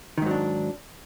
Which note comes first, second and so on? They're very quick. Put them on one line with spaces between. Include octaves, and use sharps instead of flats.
D#3 G#2 F#3 D4